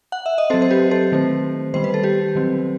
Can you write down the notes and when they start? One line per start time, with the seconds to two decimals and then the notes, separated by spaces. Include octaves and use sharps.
0.12 F#5
0.26 E5
0.38 D#5
0.50 F#3 C4 A4 C5
0.62 C5
0.70 G4 B4
0.91 A4 C5
1.12 D#3 A3 C4
1.74 D#3 G3 B3 C5
1.84 B4
1.94 A4
2.03 G4 B4
2.36 D#3 F#3 C4